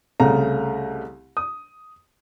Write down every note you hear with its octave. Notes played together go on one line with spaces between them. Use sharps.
C2 C#3 A3 A#5
D#6